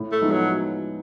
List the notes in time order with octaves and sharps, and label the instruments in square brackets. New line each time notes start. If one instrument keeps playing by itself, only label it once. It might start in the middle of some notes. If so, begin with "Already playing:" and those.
Already playing: [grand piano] A2
[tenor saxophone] A3
[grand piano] F3 G#3 B3 D#4
[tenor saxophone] F#3